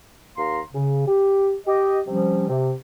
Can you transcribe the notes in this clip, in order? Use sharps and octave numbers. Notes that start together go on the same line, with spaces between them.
D#2 F5 A#5 C6
C#3
G4
G4 D#5
C3 F3 G3 C#4
C3